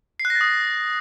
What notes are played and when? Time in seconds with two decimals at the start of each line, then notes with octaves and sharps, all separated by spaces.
0.20 C7
0.25 F#6
0.30 A#6
0.35 A6
0.41 D#6